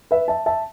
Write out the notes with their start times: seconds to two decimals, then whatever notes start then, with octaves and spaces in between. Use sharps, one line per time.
0.11 B4 E5
0.28 E5 A5
0.46 E5 A5